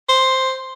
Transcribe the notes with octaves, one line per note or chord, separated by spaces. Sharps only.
C5